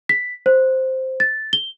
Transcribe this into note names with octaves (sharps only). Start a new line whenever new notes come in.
B6
C5
A6
G7